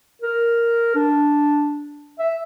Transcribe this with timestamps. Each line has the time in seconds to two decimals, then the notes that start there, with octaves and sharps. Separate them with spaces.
0.22 A#4
0.95 D4
2.19 E5